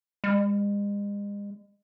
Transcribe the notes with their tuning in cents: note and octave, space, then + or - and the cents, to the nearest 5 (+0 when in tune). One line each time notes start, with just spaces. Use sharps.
G#3 -40